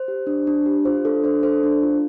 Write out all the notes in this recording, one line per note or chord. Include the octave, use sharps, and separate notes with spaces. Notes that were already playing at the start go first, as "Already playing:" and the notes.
Already playing: C5
G4
D4
D4
G4
F4 C5
D4 A4
D4 C5
A4 C5
D4
F4